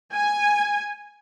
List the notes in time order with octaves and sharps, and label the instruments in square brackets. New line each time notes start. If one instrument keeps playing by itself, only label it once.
[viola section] G#5